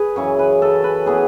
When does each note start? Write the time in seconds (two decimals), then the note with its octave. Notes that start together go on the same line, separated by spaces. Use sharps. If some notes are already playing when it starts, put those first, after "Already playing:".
Already playing: G#4 B4
0.16 F#2 C#3 E3 C#5
0.39 B4
0.62 A4
0.84 B4
1.06 E3 B3 G#4